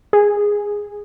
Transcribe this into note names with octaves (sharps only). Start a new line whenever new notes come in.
G#4